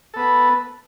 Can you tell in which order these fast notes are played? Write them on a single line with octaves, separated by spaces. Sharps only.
A4 B3 B4